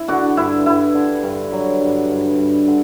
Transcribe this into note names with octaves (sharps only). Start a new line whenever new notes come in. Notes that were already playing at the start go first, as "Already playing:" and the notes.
Already playing: E4
D3 D4 F#4
G2 E4
G2 E4
D3
G2
F#3
G2
G2
G2
D3